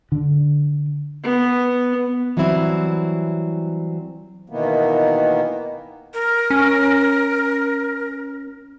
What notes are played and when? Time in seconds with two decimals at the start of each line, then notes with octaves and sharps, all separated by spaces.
0.12 D3
1.24 B3
2.37 E3 F#3 G3 C4 E4
4.50 B2 D#3 E3 A#3 B3
6.14 A#4
6.50 C#4